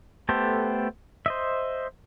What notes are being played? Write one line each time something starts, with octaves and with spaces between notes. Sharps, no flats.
A3 B3 G4 A4 C5
C5 D#5 E5